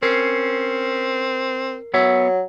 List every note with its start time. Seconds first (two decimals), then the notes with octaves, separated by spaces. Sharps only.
0.03 C4 C#4 A#4 C7
1.94 F#3 B3 C#5 E5